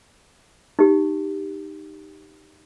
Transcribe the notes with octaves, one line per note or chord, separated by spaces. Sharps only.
D#4 G4